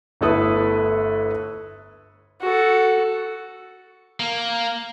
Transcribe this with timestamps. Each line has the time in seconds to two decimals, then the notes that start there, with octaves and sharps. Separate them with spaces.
0.21 G1 A3 E4 A4 B4 D#6
2.41 F#4 A4
4.20 A#3